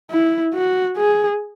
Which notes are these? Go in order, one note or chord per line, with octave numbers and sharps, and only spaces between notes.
E4
F#4
G#4